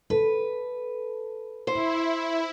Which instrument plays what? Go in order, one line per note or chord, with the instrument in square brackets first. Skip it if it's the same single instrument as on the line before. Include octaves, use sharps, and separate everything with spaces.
[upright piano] A4 [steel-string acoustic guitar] B4
[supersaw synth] E4 [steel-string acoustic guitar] C5